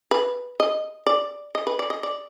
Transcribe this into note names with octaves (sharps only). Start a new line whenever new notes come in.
B4
D#5
D5
D#5
B4
D5
D#5
D5